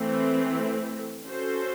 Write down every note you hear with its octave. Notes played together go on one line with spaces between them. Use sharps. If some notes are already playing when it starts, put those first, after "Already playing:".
Already playing: E3 A3 C4
C#4 F#4 A4 C5